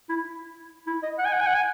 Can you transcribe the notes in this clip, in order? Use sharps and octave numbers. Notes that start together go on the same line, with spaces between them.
E4
E4
D#5
F#5
G#5
F#5
G#5
F#5
G#5